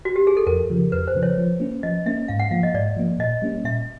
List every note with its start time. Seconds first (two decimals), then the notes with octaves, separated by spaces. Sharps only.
0.05 F#4
0.16 G4
0.27 G#4
0.37 A4
0.47 F2 A#4
0.70 C#3 F3
0.92 F2 B4
1.08 C5
1.15 C#3 F3
1.23 C#5
1.38 F3
1.60 A#3 C#4
1.83 F3 D#5
2.06 A#3 C#4 E5
2.28 G#2 F5
2.39 F#5
2.51 F3 A#3 F5
2.63 D#5
2.74 G#2 D5
2.96 F3 A#3
3.19 A#2 D#5
3.42 G3 A#3 C#4
3.64 A#2 E5